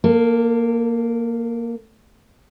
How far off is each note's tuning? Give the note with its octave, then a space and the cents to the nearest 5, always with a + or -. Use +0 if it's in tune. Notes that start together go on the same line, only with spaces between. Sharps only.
A#3 +0 A4 +35